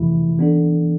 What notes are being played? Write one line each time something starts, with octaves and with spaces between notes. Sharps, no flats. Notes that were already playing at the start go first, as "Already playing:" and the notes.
Already playing: F2 C3 E3 A3 E4
E3 B3 D4 A4